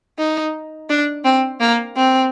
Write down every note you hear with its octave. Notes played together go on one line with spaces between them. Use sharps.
D#4
D4
C4
A#3
C4